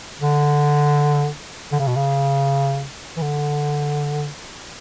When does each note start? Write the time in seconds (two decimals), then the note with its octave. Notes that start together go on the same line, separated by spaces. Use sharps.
0.22 D3
1.72 D3
1.80 C#3
1.88 B2
1.96 C#3
3.17 E3
3.22 D3